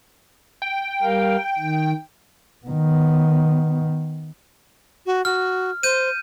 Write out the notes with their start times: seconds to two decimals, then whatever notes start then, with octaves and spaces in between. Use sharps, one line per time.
0.62 G5
1.03 G3 A#4 F5
1.59 D#3
2.66 D#3 B3
5.06 F#4
5.25 F#4 F6
5.83 C5 G6 D#7